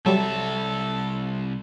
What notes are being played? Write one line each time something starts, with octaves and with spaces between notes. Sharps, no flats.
C2 F#3 G3 A4 E5